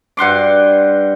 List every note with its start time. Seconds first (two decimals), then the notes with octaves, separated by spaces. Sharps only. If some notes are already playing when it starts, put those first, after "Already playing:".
0.17 G2 F#5 C6 D6